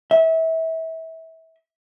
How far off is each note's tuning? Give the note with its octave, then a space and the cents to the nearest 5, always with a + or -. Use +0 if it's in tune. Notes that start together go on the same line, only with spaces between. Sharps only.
E5 -25